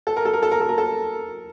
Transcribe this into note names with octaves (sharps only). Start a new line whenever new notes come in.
A4
A#4
A4
A#4
A4
A#4
A4
A#4
A4